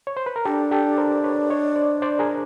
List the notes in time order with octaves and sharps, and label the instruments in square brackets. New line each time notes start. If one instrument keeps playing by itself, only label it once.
[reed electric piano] C#5
C5
B4
A#4
[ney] D4 [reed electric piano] G4 A4
[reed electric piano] G4 A4
A#4 C5
D5
B4 C#5
C#5 D#5
C5 D5
C5 D5
G#4 A#4